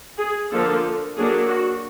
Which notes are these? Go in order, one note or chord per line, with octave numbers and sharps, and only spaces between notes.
G#4
D3 F3 A#3 D4 A4
F#3 A#3 D4 G#4
F#4